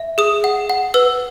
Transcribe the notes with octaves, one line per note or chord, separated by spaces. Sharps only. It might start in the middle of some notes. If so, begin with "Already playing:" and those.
Already playing: E5
G#4 D#6
F#5
F#5
B4 E6